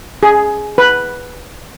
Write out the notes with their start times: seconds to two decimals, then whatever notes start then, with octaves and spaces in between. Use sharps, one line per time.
0.23 G#4
0.78 B4